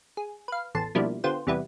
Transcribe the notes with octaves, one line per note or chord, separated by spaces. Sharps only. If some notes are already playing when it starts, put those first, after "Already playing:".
G#4
B4 F5
A1 E2 A4 A5 C6
B2 F3 G3 A#3 D4 E4
D3 B3 F4 G4 C5
E2 C3 G3 B3 E4